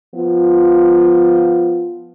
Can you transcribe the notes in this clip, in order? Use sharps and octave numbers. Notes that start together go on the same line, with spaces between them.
F3 B3 F4